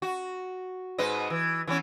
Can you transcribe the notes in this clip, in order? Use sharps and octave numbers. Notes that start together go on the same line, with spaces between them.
F#4
G#2 B4 D#5
E3
E3 B3 C#4